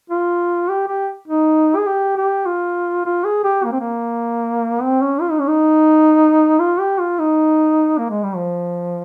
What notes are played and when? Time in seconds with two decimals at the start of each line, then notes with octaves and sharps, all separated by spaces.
0.10 F4
0.69 G4
0.88 G4
1.28 D#4
1.77 G#4
1.87 G4
2.17 G4
2.46 F4
3.06 F4
3.25 G#4
3.44 G4
3.64 A#3
3.72 C4
3.80 A#3
4.82 C4
5.01 C#4
5.21 F4
5.31 D#4
5.40 C#4
5.48 D#4
6.60 F4
6.80 G4
6.99 F4
7.19 D#4
7.98 A#3
8.10 G#3
8.23 G3
8.36 F3